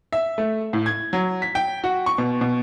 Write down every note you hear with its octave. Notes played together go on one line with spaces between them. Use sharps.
E5
A3
A2
G#6
F#3
B6
G5
F#4
C#6
B2
B2